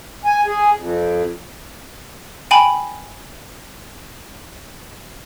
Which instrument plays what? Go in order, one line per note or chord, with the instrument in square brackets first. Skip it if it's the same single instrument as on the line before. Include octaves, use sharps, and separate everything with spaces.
[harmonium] G#5
G#4
F2
[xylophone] G5 G#5 B5